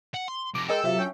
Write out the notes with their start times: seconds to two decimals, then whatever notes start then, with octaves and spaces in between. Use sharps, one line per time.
0.14 F#5
0.28 C6
0.55 F2 C3 D6 A#6
0.69 G#3 A4 A#4 D#5 G5 G#5 E6
0.84 C3 F#3 F4 E5
0.99 C#4 D4 G5